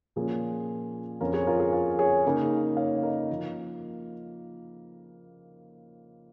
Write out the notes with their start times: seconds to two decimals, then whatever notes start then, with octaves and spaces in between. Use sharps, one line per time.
0.16 A#2 F3 A#3 C#4 G#4
1.20 F2 F3 C#4 F4 A#4
1.33 G#4 C#5
1.47 F4 A#4
1.60 G#4
1.73 F4
1.99 G#4 C#5
2.25 C#3 A#3 D#4
2.77 C#5 F5
3.03 A#4 D#5
3.29 F3 A#3